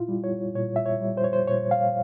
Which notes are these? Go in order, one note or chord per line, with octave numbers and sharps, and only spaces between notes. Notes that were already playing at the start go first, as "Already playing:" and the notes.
Already playing: A#2 E4 F4
G3
C#5
A#2 C#5
E5
C#5
G3
C5
C#5
C5
A#2 C#5
F5